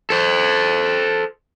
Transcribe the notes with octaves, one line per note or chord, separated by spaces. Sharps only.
A4 C5